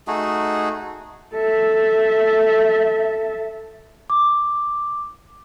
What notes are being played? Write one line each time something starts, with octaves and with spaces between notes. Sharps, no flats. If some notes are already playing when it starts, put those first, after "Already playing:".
A3 D#4 F#4 G#4
A4 E5
D6